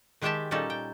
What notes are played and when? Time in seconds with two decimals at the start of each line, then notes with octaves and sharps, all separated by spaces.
0.22 D#3 G#3 G4 E5 G5 A5
0.51 A#2 G3 C#4 D#4 A4
0.70 G5